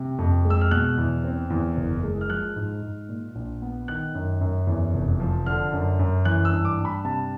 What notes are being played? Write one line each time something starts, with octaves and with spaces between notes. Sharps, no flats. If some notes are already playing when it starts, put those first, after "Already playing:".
Already playing: C3
F2
G#3
E6
F6
B2 F#6
E2
C4
E2
F#1
G#3
F6
F3 F#6
G#2
G#2
A#2
A#1
B3
D#3 F#6
F#2
F#2
E2
F1
F3
D3 F6
F#2
F#2
E3 F#6
E6
G2
D6
G2
B5
C3 A5